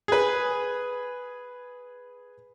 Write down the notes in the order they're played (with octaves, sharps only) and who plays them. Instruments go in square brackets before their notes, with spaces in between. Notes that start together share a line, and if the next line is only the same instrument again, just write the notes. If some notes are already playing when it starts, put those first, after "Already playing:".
[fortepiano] G#4 B4